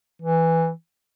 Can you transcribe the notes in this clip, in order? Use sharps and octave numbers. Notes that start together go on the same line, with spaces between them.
E3